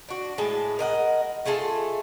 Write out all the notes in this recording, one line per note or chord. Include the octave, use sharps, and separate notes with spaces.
D4 F#4
A2 G#3 A5
A#4 D#5 F#5
A3 F4 G#4 A4